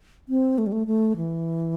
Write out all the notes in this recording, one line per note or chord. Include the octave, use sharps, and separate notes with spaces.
C4
A3
G3
A3
A3
E3